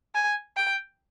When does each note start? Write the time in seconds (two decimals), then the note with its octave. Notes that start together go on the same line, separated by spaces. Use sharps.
0.15 G#5
0.57 G5